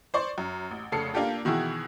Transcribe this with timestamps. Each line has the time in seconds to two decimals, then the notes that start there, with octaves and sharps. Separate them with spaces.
0.14 C5 D5 C#6
0.38 F#2
0.71 A1
0.92 F1 C#3 A4 C7 C#7
1.14 A#3 D4 F4 G4 A4
1.45 B2 D#3 E3 E4 F#4 G#4